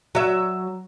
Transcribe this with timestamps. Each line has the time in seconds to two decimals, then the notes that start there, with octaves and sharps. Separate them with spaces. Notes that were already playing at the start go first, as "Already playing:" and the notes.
0.15 F#3 E5